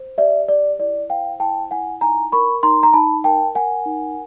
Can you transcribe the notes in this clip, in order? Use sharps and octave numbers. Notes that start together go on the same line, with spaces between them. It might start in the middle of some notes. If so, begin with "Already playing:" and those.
Already playing: C5
G4 D5 E5
G4 D5
E4 D5
C5 F5 G5
E4 G5 A5
E4 F#5 G#5
D#4 G#5 A#5
A#4 B5 C#6
D#4 A#5 C6
A#5
D#4 A5 B5
A#4 G5 A5
A#4 F#5 G#5
D#4